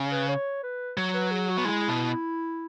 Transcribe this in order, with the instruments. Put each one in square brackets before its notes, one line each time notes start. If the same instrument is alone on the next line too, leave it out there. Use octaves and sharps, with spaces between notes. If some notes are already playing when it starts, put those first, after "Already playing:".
Already playing: [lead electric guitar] C#3
[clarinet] B4
C#5
B4
[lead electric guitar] F#3
[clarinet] B4
G#4
F#4
[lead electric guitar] B3
[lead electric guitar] G#3 [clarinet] E4
[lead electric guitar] B2